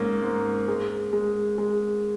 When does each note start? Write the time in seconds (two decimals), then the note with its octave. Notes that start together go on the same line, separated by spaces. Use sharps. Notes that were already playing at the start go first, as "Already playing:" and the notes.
Already playing: G#2 A#3 C#4
0.22 G#2
0.68 G#3
1.13 G#3
1.58 G#3